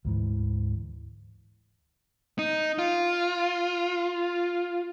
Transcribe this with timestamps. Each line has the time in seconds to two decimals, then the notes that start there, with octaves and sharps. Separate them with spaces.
0.05 D2 G#2 E3
2.39 D#4
2.78 F4